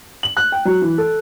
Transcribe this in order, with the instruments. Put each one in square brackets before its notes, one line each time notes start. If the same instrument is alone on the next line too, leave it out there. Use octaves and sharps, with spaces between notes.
[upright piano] F#7
F#6
G5
F#3
E3
A4